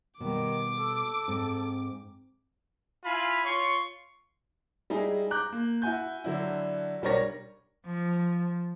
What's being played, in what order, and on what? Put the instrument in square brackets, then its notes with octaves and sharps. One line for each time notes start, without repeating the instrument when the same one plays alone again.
[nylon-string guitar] B2 G3 [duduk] D#3 [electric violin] D6
[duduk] A4 [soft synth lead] E6
[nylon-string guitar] G#2 [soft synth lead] C4
[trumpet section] E4 F4 F5 G#5 B5
F4 C#5 C6 C#6
[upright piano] G3 G#3 D#4 E4 G#4
A#5 D6 F#6 G6
A#3
E4 F#4 G#5 G6
D3 F#3 D4 E4
B1 G3 D4 A#4 C#5 A#6
[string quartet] F3